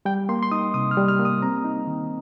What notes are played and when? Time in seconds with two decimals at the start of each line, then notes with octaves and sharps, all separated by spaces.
0.05 G3 G5
0.29 A#3 C6
0.43 C6
0.52 D#4 D#6
0.74 C3 D#6
0.91 F6
0.97 G3
1.08 F6
1.19 A#3
1.25 D#6
1.42 C4 A#5
1.65 D#4
1.87 D#3